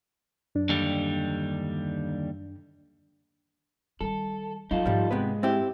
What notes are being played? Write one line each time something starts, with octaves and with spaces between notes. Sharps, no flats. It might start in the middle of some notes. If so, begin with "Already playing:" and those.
F#2 D4
D#2 D3 G3
D#3 G3 A4
F3 F#3 D#4 F4 A4
G#2 F3 G3
C3 G#3 B3 B4
C4 E4 G4